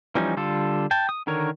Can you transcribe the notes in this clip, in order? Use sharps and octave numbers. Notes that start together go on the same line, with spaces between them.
E3 F3 G3 C#4 D#4
D3 G3 F4 A4
G5 A5
D#6
D3 D#3 A#4 C#5